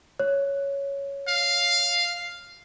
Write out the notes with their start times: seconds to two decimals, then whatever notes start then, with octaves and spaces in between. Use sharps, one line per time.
0.20 C#5
1.28 F5